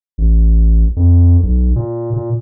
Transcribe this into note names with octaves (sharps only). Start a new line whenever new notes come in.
A1
F2
B1
A#2
A#2